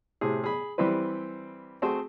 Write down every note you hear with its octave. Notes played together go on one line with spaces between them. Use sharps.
A2 C3 G#4
G#4 B5
E3 G3 C4 E4 B4
A3 C4 F#4 G#4 C5